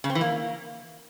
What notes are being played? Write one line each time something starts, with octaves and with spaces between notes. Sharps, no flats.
C#3
C4
E3
A#3